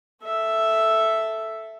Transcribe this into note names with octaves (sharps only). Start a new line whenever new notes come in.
A4 E5